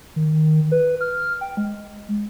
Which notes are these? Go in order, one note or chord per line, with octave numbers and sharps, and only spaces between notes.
D#3
B4
F6
G5
G#3